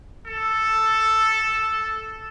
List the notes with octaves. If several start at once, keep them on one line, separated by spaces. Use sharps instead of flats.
A4